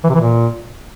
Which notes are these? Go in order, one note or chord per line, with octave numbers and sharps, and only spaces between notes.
E3
C3
E3
A#2